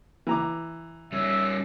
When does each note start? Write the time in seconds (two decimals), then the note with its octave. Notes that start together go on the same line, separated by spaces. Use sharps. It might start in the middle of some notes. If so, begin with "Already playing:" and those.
0.27 E3 A#5 D6
1.12 G3 C#4 E5